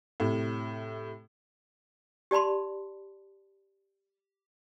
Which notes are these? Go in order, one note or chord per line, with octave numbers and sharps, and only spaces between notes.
A2 C3
G4 D5 A5 B5 C6